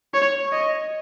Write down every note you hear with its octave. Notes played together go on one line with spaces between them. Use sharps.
C#5
D#5